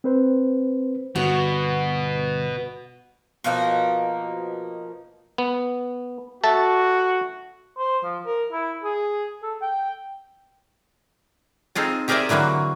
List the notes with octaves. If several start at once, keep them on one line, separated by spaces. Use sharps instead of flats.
C4 B4 C5
G1 B2 F#4
B2 F3 A#3 D#4
B3
F#4 A4 E5 A5
C5
F3
A#4
E4
G#4
A4
G5
C4 D#4 F4 G#4 A4
G4 G#4 A#4 C5 D5 E5
D3 E3 F#3 A#3 F#4